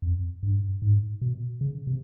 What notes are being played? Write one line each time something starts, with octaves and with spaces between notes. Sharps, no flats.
F2
G2
G#2
B2
C#3
C3